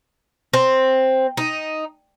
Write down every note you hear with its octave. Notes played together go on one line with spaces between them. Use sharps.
C4
D#4